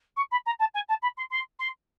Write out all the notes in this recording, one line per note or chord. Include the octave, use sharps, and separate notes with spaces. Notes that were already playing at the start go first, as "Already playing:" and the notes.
C#6
B5
A#5
A5
G#5
A5
B5
C6
C6
C6